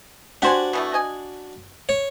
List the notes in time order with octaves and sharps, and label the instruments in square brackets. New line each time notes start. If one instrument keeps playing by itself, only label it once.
[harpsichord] D4 F#4 [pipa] G4 C5 G#5
[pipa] B2 E3 A3
D#5 G#5
[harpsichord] C#5